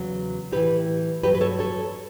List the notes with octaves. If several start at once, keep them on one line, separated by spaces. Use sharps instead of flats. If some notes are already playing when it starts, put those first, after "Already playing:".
Already playing: E2 C#3 F#3
A2 E3 G4 B4
G2 F#3 G4 B4
B4
A4 C#5
A4 C#5